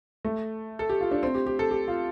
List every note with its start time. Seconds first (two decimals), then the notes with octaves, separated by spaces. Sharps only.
0.25 A3
0.79 A4
0.89 G4
1.01 F4
1.11 D4
1.23 C4
1.34 G4
1.47 G4
1.59 A4
1.71 G4
1.88 F4